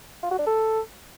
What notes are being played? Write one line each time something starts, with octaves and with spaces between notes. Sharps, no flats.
F4
F#4
D4
A4